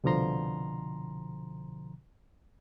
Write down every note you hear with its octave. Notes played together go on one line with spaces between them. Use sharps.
C2 B2 D3 F3 A#5 C6